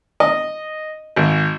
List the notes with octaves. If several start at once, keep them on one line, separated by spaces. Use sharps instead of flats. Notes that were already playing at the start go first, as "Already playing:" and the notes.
D#5
G#1